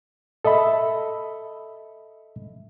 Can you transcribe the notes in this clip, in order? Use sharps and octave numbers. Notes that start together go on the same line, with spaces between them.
A4 D#5 E5 B5